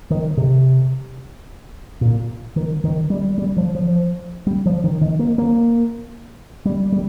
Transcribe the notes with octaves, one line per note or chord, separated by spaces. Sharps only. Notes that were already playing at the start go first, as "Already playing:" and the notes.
D#3
C3
A#2
D#3
D#3
G3
G3
F3
F3
G3
F3
D#3
D#3
A#3
A#3
G3
G3